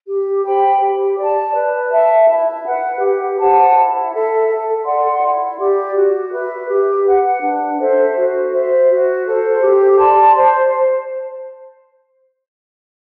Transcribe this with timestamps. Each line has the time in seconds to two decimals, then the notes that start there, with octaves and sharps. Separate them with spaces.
0.07 G4
0.44 C5 G5 B5
0.80 G4
1.17 D5 A5
1.54 B4
1.91 E5 A5
2.27 E4
2.64 B4 F#5
3.00 G4
3.38 C5 F#5 A5
3.74 E4
4.11 A4 E5
4.48 A4
4.84 D5 F#5 C6
5.21 E4
5.58 G4 D5
5.95 F#4
6.31 B4 E5
6.68 G4
7.05 B4 F#5
7.42 D4
7.78 A4 C5 E5
8.15 F#4
8.51 C5 E5
8.88 F#4
9.25 A4 C5
9.61 G4
9.98 D5 A5 C6
10.35 C5